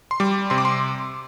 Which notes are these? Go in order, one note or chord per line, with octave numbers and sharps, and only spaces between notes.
C6
G3 D6
C3 C6
D6
C6